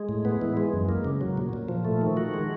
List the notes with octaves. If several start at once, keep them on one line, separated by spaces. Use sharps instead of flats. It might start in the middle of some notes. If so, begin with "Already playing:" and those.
Already playing: G#3
A2
B3
E3
G#3
F#2
A#3
C#3
F#3
A#2
A#2
F3
A3
D#3
F#4
G#3